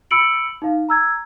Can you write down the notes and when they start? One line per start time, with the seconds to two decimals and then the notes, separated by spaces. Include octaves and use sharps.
0.11 B5 E6 C#7 D7 F#7
0.62 D#4 F5
0.89 A#5 E6 G#6